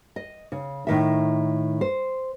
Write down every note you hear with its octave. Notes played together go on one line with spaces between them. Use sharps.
D#5
C#3
A2 D#3 E5
C5